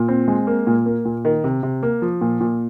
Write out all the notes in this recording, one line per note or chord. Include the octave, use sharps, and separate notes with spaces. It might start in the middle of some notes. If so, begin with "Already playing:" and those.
Already playing: A#2
C4
G#3
A#3
A#2
A#3
A#2
D#3
C3
C3
A#3
F3
A#2
A#2